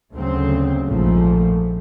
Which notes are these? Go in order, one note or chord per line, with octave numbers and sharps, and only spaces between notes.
D2 C#3 F#3 A3 C4
A#1 G#2 F3 A3